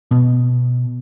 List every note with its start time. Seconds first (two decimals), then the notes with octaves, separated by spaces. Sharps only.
0.11 B2